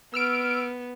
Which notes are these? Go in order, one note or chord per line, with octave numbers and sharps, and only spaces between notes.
B3 E6 F6 D7